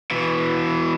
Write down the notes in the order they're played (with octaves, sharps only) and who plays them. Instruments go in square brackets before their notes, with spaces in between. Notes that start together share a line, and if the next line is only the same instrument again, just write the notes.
[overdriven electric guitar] B2 E3